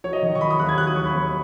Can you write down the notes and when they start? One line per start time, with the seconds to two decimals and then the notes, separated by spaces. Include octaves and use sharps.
0.04 F#3 C#5
0.13 D#5
0.23 D#3
0.35 C#6
0.41 F#3 B5
0.50 D#6
0.60 D#2 F#6
0.69 G#6
0.78 F#3 F#6
0.87 D#6
0.96 D#2 C#6
1.06 B5
1.15 D#2